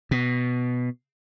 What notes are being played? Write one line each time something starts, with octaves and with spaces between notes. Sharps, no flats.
B2